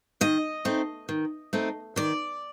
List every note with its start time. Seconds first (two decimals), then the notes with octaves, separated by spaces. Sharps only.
0.21 D#3 D#5
0.65 A3 C4 D#4
1.09 D#3
1.53 A3 C4 D#4
1.96 D#3 D5